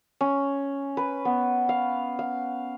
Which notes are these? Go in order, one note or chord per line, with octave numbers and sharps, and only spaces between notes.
C#4
B4
B3
F5
F5